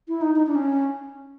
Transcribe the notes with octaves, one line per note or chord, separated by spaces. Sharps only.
E4
D#4
D#4
D4
C#4